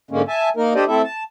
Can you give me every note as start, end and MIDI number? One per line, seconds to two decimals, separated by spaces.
0.11 0.22 44
0.11 0.22 50
0.11 0.22 56
0.11 0.22 58
0.11 0.22 61
0.28 0.49 76
0.28 0.49 80
0.28 0.49 81
0.57 0.73 58
0.57 0.73 63
0.57 0.73 70
0.75 0.84 62
0.75 0.84 67
0.75 0.84 69
0.75 0.84 72
0.75 0.84 74
0.75 0.84 75
0.88 1.02 57
0.88 1.02 60
0.88 1.02 64
0.88 1.02 69
0.88 1.02 76
1.04 1.23 81